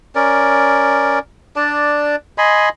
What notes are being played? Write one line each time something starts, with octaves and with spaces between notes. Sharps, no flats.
C#4 A#4 D5
D4 D5 A5
D#5 G#5 B5 C6